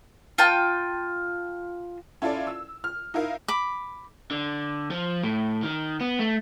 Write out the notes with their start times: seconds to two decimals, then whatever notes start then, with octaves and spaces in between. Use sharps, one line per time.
0.38 F4 G5 A5
2.22 C#4 E4 F4 A4 D5
2.47 E6
2.84 F6
3.14 D#4 E4 A#4 F5
3.48 B5 D6
4.31 D3
4.91 F3
5.23 A2
5.63 D#3
6.01 B3
6.19 A3